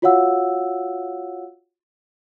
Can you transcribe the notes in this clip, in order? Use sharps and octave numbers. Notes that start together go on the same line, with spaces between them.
F4 F#4 C#5 F5 F#5 E6